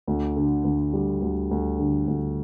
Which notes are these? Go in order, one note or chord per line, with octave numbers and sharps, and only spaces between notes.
D2
D3
D2
G3
D2
D2
D3
D2